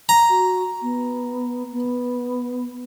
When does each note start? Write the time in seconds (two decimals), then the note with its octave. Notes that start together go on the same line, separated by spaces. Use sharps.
0.09 A#5
0.29 F#4
0.81 B3
1.71 B3